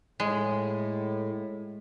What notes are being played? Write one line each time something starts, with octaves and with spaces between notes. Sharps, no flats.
A2 G#3